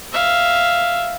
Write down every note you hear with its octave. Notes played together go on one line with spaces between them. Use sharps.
E5 F5